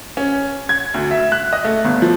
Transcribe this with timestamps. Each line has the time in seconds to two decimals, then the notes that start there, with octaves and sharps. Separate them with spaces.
0.17 C#4
0.69 G#6
0.94 D2
1.11 E5
1.32 F#6
1.53 D#5
1.64 A3
1.85 G1
2.02 F3